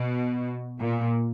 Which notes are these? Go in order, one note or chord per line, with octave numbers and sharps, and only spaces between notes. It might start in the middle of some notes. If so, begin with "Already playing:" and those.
Already playing: B2
A#2